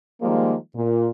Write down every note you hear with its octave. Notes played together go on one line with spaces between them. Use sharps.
D#3 F3 G3 G#3 A#3
A#2